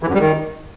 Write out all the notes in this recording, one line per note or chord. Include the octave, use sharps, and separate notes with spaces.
E3
F#2
G3
D#3